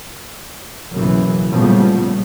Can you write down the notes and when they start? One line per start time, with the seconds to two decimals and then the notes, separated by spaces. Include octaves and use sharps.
0.92 F#1 B1 F#2 C#3 E3
1.51 A#2 C#3 F3 G3 A3 B3